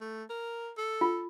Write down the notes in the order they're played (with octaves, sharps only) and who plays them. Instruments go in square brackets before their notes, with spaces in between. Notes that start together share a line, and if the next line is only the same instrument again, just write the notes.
[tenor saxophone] A3
A#4
A4
[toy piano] F4